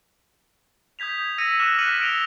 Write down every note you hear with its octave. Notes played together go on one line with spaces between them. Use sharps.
D#6 G6 G#6 B6 F7
E6 A#6 B6 C#7 D#7
D6 F6 F#6 A#6 E7
F#6 B6 C#7 D#7 E7 F#7
E6 A#6 D7 E7 F7 G7